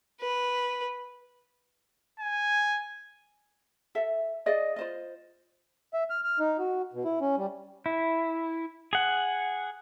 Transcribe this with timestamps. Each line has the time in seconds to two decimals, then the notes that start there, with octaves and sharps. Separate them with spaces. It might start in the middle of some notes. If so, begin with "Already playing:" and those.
0.21 B4
2.20 G#5
3.95 A4 E5
4.46 G#4 D5 D#5
4.76 F4 C5 D#5
5.94 E5
6.10 F6
6.24 F6
6.39 D#4
6.59 F#4
6.93 B2
7.05 E4
7.21 C#4
7.37 G3
7.86 E4
8.93 G#4 F#5